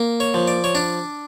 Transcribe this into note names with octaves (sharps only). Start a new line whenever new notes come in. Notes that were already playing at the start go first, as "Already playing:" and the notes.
Already playing: A#3
C#5
F3
D5
C#5
D4 D5